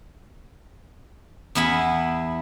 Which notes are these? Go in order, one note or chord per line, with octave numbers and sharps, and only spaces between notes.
E2 B3 E4 B5